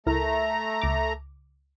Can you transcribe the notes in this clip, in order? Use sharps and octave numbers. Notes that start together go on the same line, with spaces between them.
C#2 A3 E4 A#4 A#5
C#2 D6